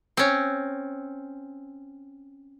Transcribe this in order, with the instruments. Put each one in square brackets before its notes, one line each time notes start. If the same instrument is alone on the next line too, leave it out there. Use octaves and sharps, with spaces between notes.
[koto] C4 C#4